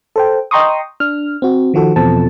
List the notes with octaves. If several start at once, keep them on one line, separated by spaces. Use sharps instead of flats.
A4 C5 G5
D#5 G5 A#5 C6 C#6 D#6
D4 F6
C4 F#4
D#3 F3 F#4 A4
E2 B2 F3 C4 A4 A5